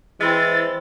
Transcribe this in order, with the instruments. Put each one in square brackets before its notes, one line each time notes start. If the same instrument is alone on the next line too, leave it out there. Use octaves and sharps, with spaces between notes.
[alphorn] E3 [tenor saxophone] G#3 [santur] C4 E4 E5 [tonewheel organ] A6